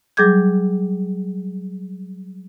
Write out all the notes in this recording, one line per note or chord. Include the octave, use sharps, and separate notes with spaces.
F#3 G3 G#4 D6 G6 G#6